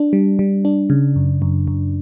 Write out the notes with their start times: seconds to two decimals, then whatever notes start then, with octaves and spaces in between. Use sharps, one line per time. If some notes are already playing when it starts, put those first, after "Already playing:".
Already playing: D4
0.13 G3
0.39 G3
0.65 D4
0.90 C#3
1.16 F#2
1.42 F#2
1.68 F#2